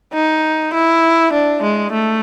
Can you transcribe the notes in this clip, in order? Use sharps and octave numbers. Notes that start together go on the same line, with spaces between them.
D#4
E4
D4
G#3
A3